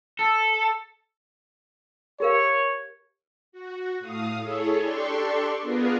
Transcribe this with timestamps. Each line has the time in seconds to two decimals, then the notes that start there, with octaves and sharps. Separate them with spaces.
0.19 A4
2.20 G4 A#4 C#5 F5
3.52 F#4
4.00 A2 F5 D#6
4.41 E4 G#4 A4 C#5
4.83 D4 G4 A4 D5 C6 C#6
5.62 B3 D4 F4 G#4 A#4 B4